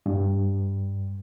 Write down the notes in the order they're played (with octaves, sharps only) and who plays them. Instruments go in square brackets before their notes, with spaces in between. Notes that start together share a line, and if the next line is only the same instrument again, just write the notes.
[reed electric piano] G2